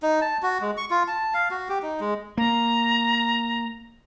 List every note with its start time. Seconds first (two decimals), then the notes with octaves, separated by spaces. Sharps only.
0.02 D#4
0.22 A5
0.43 F#4
0.61 G#3
0.77 C#6
0.90 F4
1.08 A5
1.34 F5
1.51 F#4
1.69 G4
1.82 D#4
2.00 G#3
2.37 A#3 A#5